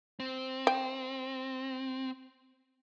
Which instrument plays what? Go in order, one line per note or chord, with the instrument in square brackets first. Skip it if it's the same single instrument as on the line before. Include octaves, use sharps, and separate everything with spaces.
[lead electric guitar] C4
[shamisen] G5